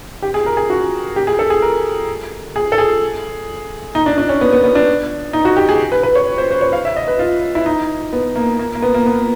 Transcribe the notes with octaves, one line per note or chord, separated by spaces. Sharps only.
G4
G#4
A#4
G#4
F#4
G4
G#4
A4
G#4
A#4
G#4
A4
G#4
D#4
D4
D4
C#4
B3
B3
B3
D4
D#4
F#4
G4
G#4
B4
B4
C#5
C5
C5
C#5
F5
E5
D#5
B4
F4
E4
D#4
B3
A#3
A#3
A#3
B3
A#3
B3